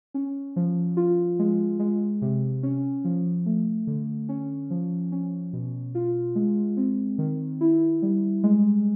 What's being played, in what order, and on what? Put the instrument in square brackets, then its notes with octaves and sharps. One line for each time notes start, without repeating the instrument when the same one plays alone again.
[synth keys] C#4
F3
F4
G#3
G#3
C3
C#4
F3
A3
D3
C#4
F3
C#4
B2
F4
G#3
C4
D#3
E4
G3
G#3